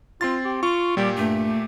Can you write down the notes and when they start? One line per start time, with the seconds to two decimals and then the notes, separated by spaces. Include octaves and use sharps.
0.21 C4 F4 C6 A6
0.45 G4
0.63 F4 C#6
0.97 A#2 G3 G4
1.17 G2 A3